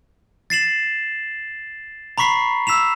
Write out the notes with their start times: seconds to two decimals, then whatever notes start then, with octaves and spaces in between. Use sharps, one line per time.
0.50 A6 C7 E7 F#7
2.18 A#5 B5 C#6 B6 C7
2.67 E6 B6 E7 F7